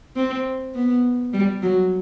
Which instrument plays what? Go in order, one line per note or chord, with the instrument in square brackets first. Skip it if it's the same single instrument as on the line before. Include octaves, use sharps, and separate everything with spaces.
[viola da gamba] C4
B3
G3
F#3